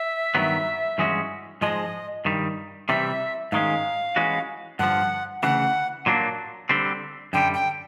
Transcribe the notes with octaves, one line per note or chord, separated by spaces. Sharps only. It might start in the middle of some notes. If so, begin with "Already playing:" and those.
Already playing: E5
G2 D#3 F#3 B3
G2 E3 G#3 C#4 F#4
G#2 F3 G#3 D#5
G2 D#3 G3
C3 E3 G3 E5
G#2 D#3 G#3 C#4 F5
E3 G#3 C#4 F#4
G2 D3 F3 F#5
D2 C#3 E3 F#5
A#2 F#3 A#3 D4
D3 G3 C4
F#2 D3 G3 G5
G5